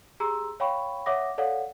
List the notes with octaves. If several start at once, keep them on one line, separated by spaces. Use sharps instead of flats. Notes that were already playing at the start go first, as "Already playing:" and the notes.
G4 G#4 A#5 C6 E6
C#5 F5 G5 B5 C#6
C#5 E5 F#5 D6 D#6 A#6
A4 C#5 D5 F5 F#5